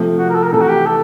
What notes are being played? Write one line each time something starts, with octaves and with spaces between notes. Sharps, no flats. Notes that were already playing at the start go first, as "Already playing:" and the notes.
Already playing: C3 F3 A3
F#4
A#4
A4
A#4
C3 E3 A3 A4
F#4
G4
A4